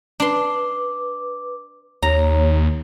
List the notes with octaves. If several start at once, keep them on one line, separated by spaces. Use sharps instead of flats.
D4 B4 C6 D6
D#2 C#5 A#5